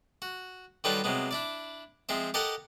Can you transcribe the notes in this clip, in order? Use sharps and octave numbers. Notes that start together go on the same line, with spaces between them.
F#4
D#3 F#3 G3 F4 A4 B4
C3 F#3 G#3 B3
D4 E4 D5
F3 G#3 C4 E5
G4 A4 A#4 D#5 F#5